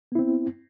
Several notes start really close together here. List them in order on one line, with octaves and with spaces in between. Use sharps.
B3 E4 C4